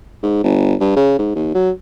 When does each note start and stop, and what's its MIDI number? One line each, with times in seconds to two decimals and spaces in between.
0.23 0.41 44
0.43 0.74 31
0.80 0.96 43
0.96 1.18 49
1.19 1.34 44
1.36 1.51 39
1.55 1.71 54